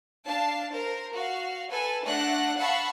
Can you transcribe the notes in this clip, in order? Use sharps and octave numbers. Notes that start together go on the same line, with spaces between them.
D4 F5 A5
A#4 C5
F#4 F5
A4 B4 G#5
A3 D4 F#5 F#6 A#6
F5 F#5 A5 B5 C#6 E6